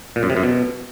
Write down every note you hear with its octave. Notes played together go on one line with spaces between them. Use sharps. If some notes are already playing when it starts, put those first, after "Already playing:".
A#2
F#2
C3
F#2
B2